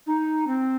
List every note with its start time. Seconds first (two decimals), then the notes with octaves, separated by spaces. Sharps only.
0.07 D#4
0.47 C4